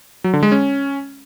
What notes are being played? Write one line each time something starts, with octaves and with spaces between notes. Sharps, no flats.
F#3
D3
G#3
C#4